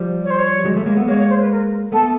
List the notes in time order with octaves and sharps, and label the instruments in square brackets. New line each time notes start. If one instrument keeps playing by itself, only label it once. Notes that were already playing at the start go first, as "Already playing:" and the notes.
Already playing: [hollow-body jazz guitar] F3 G3
[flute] C#5
C5
C#5
[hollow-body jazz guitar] F#3 G#3
G3 A3
G#3 A#3
A3 B3
[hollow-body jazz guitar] G#3 A#3 [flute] C#5
[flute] C#5
C5
B4
A#4
[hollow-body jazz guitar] A3 B3 [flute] A4